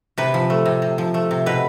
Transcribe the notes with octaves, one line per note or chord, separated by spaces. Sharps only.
C3 B4
F3
A3
C3
C3
F3
A3
C3
B2 B4